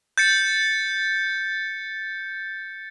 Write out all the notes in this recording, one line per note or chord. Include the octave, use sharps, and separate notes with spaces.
G6 A6 C#7